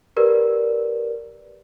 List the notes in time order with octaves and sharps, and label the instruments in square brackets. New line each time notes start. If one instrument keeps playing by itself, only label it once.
[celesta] G4 A#4 B4 D5